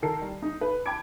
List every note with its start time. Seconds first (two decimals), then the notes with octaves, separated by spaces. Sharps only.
0.02 D#3 A4 A#4 A5 C7
0.21 G3
0.42 D#4
0.61 B4
0.86 G5 A5 B5 D6 G#6 D7